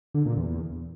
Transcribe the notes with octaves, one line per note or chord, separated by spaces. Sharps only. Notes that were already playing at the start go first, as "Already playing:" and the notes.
D3
A#2
E2